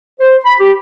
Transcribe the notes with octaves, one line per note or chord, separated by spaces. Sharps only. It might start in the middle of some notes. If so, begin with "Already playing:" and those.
C5
B5
G4